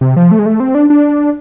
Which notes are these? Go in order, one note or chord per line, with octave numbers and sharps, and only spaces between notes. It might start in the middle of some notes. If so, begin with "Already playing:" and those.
C3
F3
A3
G#3
A3
C4
D4
D4